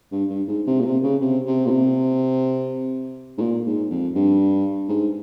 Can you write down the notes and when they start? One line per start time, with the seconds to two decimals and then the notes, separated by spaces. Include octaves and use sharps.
0.12 G2
0.30 G2
0.48 G#2
0.67 C3
0.80 A#2
0.85 C3
1.03 C#3
1.21 C3
1.47 C3
1.66 A#2
1.70 C3
3.38 G#2
3.41 A#2
3.66 G#2
3.91 F2
4.15 G2
4.89 G#2